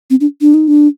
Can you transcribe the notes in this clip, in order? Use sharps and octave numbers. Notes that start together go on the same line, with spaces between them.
C4
D4
D4
D#4
D4